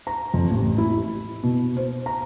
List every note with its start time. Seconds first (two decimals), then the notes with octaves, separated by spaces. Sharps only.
0.07 A#5
0.34 F2
0.51 A1
0.78 E4
1.44 B2
1.77 C5
2.06 A#5